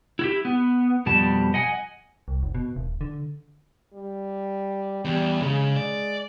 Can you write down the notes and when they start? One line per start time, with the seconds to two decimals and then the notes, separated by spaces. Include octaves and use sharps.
0.19 E4 F#4 G4
0.45 B3
1.06 F2 B2 G3 A5
1.54 D#5 F#5 G#5
2.28 C2
2.43 F1
2.54 B2
2.76 D#1
3.01 D3
3.94 G3
5.05 E2 G3
5.42 C#3 G#3
5.76 D5